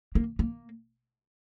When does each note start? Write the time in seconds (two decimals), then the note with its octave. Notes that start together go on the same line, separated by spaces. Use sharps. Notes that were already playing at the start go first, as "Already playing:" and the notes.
0.15 A#3
0.39 A#3